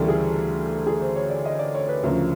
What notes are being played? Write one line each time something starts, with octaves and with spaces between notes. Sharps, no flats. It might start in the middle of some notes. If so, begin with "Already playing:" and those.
Already playing: D2 C#3 E3 G3 A4 A#4
G#4
G#4
C5
C#5
D5
D#5
D5
C#5
B4
D2 C#3 F3 A#4